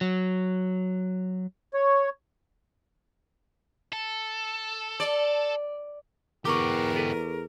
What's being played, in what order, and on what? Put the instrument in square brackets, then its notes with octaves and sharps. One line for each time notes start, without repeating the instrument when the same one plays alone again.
[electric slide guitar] F#3
[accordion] C#5
[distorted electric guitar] A4
[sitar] D5
[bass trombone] E2 [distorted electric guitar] B3 G4 [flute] A#4 [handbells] C#6 D6
[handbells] G#4 A4